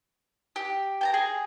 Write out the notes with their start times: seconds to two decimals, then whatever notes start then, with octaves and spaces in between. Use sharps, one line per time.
0.56 G4
1.01 G5 A5 A#5
1.14 G#4